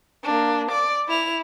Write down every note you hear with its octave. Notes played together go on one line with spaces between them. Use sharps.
A#3 D4
D5 D6
E4 F7